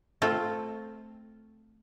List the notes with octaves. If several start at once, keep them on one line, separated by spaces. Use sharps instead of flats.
A3 C4 F4